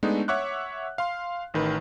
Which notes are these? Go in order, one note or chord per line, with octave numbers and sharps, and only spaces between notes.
G#3 A3 B3 D4 D#4
C#5 E5 F#5 C#6 D6 F#6
F5 C6
A1 D#3 B4